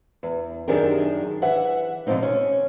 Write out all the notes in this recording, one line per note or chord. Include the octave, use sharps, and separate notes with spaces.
E2
F#2 D#3 D4 G4 G#4 A#4
E3 E5 F#5
B2 D3 F3 A#3 C4 D#4
C#4